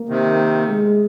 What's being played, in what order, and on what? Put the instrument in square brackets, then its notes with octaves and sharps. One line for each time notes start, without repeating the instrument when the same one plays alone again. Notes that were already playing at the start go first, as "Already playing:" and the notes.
Already playing: [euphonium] A#3
[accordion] C3 D#3
[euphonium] G#3